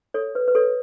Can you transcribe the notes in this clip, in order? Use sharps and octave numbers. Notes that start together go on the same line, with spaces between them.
A4 C#5
B4
B4
A4 C#5